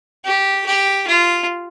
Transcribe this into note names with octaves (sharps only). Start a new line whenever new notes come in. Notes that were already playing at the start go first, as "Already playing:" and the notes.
G4
G4
F4